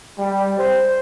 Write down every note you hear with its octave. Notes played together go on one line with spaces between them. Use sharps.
G3
C5